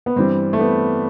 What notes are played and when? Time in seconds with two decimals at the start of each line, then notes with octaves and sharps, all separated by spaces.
0.06 B3
0.16 G2 E3 G3 C4
0.53 A3
0.60 B3